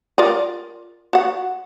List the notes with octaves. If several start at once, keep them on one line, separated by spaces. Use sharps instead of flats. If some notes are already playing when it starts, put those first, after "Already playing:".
F4 A#4 D5
F#4 F#5